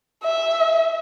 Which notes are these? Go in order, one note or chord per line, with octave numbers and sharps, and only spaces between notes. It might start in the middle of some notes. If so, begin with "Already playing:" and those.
E5